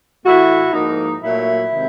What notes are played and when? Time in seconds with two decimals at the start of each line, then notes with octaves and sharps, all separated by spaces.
0.24 A2 E3 A3 E4 F#4
0.73 G#2 F3 A#3 D#4
1.22 A#2 F#3 A3 E4
1.71 C3 D#3 G#3